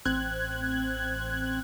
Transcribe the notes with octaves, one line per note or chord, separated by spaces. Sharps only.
A1 C4 F#6 G#6